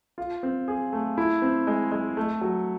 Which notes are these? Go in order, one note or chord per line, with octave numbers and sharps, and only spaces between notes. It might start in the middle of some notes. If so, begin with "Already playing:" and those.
F4
C4
G#4
A3
E4
C4
G#3
G#3
A3
F#3